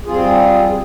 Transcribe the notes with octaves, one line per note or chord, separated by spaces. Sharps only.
G3 C4 F4 G#4